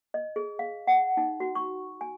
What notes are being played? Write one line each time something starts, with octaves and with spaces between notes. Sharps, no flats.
D#5
G#4
F5
F#5
D#4
F#4
C#6
G#5